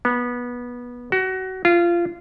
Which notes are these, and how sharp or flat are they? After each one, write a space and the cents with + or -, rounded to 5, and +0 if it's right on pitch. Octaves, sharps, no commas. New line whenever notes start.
B3 -20
F#4 +25
F4 -20